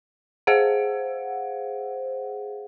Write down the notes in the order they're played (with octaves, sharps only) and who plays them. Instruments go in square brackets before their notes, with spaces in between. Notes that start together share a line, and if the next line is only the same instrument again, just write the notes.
[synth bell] G#4 C5 F5 F#5